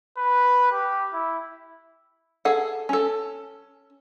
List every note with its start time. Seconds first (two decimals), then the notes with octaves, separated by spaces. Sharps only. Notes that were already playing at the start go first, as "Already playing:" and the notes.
0.18 B4
0.72 G4
1.13 E4
2.45 G#4 A4 F#5
2.89 C#4 A4